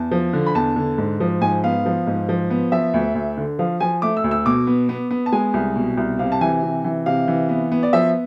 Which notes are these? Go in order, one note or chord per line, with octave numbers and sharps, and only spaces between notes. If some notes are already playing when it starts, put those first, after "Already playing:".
Already playing: E2 A5
F3
D3
B5
E2 A5
D3
G#2
F3
G#2 G#5
B3 F5
F3
G#2
F3
B3
F3 E5
D2
D2
D3
F3 F5
F3 G#5
A3 D6
E6
D2
E6
B2 D6
B3
B3
B3
A5
G#3 G#5
C2
B2
C2
C3 F5
A5
E3 G#5
C3
E3
C3 F5
E3
B3
B3
D5
F3 E5